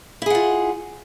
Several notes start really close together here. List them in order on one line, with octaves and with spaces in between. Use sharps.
E4 G#4 F#5 F4